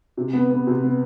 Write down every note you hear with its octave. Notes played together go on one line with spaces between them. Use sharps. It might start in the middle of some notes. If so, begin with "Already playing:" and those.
C3
B3
B3
C3
B3